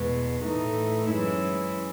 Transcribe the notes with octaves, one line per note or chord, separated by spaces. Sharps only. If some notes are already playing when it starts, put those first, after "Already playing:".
Already playing: E2 B2 G#3
A2 E3 A3 D#4
F#2 E3 G#3 C#4 E4